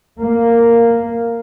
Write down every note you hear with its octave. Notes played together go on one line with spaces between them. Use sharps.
A#3